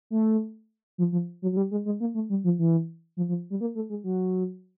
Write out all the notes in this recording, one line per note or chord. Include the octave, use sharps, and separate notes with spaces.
A3
F3
F3
F#3
F#3
G3
G#3
G#3
A#3
A3
G3
F3
E3
F3
F3
G3
A#3
A3
G#3
F#3